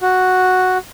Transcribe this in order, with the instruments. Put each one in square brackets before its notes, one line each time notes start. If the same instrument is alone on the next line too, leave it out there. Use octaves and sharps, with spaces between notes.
[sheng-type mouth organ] F#4